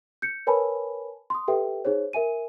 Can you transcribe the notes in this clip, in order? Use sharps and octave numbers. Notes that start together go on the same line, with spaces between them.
G6 C#7
A#4 B4 C#5 G#5 A5 B5
C6 D#6
G4 A4 B4 E5 G5
D#4 G#4 C5 C#5
A#4 E5 G#5 D#7